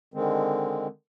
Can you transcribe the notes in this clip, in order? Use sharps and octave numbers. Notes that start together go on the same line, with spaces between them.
D3 D#3 G#3 C4